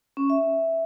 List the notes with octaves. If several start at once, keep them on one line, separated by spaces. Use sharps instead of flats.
C#4
E5